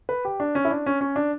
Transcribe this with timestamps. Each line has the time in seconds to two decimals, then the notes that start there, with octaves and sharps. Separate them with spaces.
0.09 B4
0.25 G4
0.40 D4
0.55 C#4
0.65 E4
0.71 D4
0.86 C#4
1.01 C#4
1.16 D4